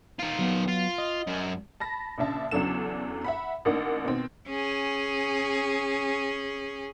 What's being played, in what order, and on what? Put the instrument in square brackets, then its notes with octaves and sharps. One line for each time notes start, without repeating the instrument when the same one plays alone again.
[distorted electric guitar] D#3 F4
[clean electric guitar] F#3 B3
[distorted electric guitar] F4
[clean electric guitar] D#5
[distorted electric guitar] F#2
[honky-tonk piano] A5 B5 A#6
A#1 C#3 D4 E5 A5
E2 C#3 F#3 D4 A4 E7
E5 F#5 B5
A1 D#3 A#3 D4 F#5
B2 D#3 C4
[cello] C#4 G#4